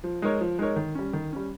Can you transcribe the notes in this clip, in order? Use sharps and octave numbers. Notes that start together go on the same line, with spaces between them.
F3
G#3 D#4 A#4 C#5
F3
G#3 D#4 A#4 C#5
D#3
G3 C#4
D#3
G3 C#4